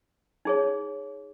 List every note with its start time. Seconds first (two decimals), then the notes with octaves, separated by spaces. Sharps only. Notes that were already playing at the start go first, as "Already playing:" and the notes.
0.45 D#4 G#4 C#5